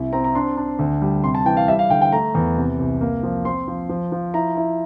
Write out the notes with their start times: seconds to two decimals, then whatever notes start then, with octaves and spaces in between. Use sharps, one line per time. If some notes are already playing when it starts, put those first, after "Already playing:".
Already playing: C2 E4
0.13 C4 A#5
0.24 A#5
0.35 D4 C6
0.57 D4
0.79 D2
1.01 G3
1.24 C3 C6
1.35 A5
1.45 E3 G5
1.57 F5
1.68 G3 E5
1.79 F5
1.90 D3 G5
2.02 G5
2.12 A3 A#5
2.35 E2
2.57 C3
2.79 C2
3.01 A#3
3.23 F3
3.45 C4 C6
3.68 F3
3.89 F3
4.12 F3
4.34 E4 A#5
4.57 E4